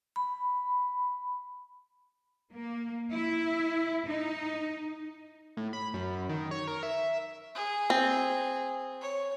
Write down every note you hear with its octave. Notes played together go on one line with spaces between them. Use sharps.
B5
A#3
E4
D#4
A2
B5
F#2
D#3
C#5
A#4
E5
G#4
C4
C#5